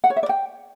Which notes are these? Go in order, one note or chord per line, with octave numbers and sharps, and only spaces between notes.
F#5
C#5
E5
D5
G5